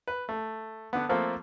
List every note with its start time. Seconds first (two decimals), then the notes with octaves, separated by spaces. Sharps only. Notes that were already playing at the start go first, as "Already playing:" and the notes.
0.08 B4
0.29 A3
0.93 D3 B3
1.09 F3 A3 A#3 C4 A4